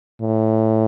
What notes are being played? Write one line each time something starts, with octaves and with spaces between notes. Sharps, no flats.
A2